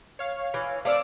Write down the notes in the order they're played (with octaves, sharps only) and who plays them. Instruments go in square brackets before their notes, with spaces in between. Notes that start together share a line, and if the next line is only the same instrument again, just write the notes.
[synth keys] C#5 F5
[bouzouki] E3
[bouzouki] A3 C4 D5 [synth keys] F5 D6 E6